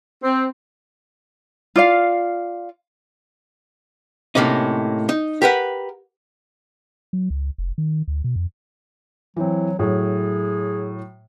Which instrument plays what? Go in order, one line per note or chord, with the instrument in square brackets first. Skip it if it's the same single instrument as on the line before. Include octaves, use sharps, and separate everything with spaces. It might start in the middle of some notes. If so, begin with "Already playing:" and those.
[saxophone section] C4
[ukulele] F4 D5 F5
[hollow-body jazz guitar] A2 C3 A#3 C#4 D#4
D#4
G4 A#4 B4 F#5
[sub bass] F#3
C#2
F1
D#3
D2
B2
F2
[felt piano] E3 C4 [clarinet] F#3
[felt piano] A2 F#3 [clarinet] G#4